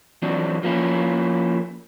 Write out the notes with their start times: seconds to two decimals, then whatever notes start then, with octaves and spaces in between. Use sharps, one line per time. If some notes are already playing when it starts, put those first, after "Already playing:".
0.22 E3 F#3 C4 D4
0.63 F3 A#3 C#4 E4